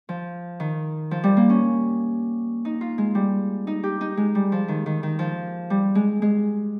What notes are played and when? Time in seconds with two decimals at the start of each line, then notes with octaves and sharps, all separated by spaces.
0.09 F3
0.60 D#3
1.11 F3
1.23 G3
1.37 A#3
1.50 C#4
2.65 D#4
2.81 F4
2.98 G#3
3.15 G3
3.67 D#4
3.83 G4
4.01 D#4
4.17 G#3
4.35 G3
4.52 F3
4.68 D#3
4.86 D#3
5.03 D#3
5.19 F3
5.70 G3
5.95 G#3
6.22 G#3